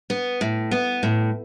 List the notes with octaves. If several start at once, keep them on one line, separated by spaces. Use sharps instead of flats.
B3
A2
B3
A2